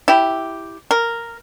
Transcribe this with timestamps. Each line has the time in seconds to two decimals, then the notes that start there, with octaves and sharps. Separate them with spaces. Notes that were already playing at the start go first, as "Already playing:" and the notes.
0.08 E4 G4
0.91 A#4